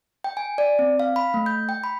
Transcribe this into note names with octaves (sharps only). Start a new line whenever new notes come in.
G5
G#5
D5
C4
F5
B5
A3
G6
G5
B5